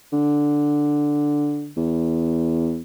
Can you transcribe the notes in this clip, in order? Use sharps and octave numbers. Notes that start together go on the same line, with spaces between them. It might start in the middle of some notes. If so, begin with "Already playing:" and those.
D3
E2